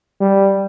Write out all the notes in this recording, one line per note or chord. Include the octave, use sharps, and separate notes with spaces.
G3